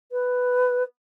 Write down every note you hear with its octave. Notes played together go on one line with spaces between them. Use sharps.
B4